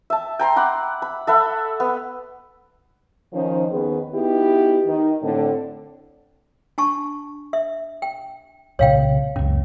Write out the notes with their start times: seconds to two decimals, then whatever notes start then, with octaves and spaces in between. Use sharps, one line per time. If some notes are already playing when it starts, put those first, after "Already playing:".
0.10 E5 A5
0.39 G5 A#5 C6
0.56 F#5 B5 D6
1.02 B5
1.27 A4 E5 F#5 B5
1.80 B3
3.33 D#3 F3 C#4 D#4 C5
3.71 D#2 D#3 B3 C#4 G#4 B4
4.14 B3 D#4 E4 F#4 G4
4.86 D#3 D#4
5.22 A2 D3 C4
6.78 D4 A5 C#6
7.53 E5
8.02 G5
8.79 C2 A#2 C#3 C#5 F5 G5
9.36 F#1 C#2 C#4